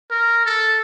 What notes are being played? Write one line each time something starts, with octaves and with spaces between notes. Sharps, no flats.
A#4
A4